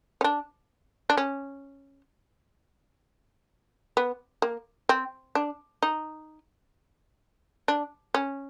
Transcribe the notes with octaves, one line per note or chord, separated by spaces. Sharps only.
C#4
D4
D4
C#4
B3
A#3
C4
D4
D#4
D4
C#4